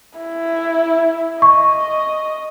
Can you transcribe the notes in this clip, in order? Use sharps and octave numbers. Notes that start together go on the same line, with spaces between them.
E4
D#5 C#6